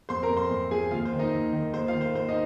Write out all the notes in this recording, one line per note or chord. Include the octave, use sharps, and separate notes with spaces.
F2 C5 C6
A#4 A#5
F2
C5 C6
F2
F3 G#4 G#5
D#2 F4 F5
C5
D#3
D#4 D#5
D#2
D#3
D#2 C5
F4 F5
D#3
C5
D#2 C5
D#4 D#5